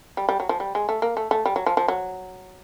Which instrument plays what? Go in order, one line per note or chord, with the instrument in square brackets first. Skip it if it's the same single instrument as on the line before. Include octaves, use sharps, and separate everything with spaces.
[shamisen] G3
G3
F#3
F3
G3
G#3
A3
A#3
A3
A3
G3
F#3
F3
F3
F#3